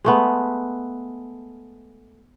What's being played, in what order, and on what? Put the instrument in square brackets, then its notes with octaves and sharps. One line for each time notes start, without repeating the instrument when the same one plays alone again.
[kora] G#3 A3 B3